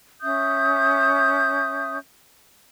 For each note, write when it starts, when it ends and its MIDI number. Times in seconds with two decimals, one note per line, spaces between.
0.22 1.98 61
0.22 1.98 76
0.22 1.98 87
0.22 1.98 91